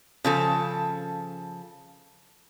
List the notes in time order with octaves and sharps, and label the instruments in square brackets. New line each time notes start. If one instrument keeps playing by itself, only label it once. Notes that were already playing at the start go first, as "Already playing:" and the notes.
[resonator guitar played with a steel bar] C#3 F3 A4